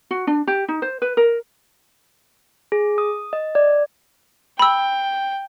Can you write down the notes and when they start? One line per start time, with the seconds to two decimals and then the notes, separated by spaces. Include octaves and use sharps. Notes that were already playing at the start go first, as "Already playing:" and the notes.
0.11 F#4
0.27 D4
0.47 G4
0.68 D#4
0.82 C5
1.02 B4
1.17 A#4
2.72 G#4
2.98 D#6
3.33 D#5
3.55 D5
4.59 G5 B5 E6